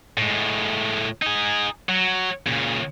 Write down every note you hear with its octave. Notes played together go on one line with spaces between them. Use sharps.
A2 G#3
D#4 G#4
F#3
A#2 C#3